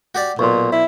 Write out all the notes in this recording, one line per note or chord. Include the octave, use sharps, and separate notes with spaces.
F#4 G4 D5 F#5
B1 A#2 C6 C#6
E4 D5 E5